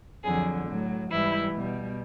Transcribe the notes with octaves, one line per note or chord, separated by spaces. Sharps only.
F2 D3 F#3 G#4
A2 F#3
G#2 E3 G3 E4
B2 G3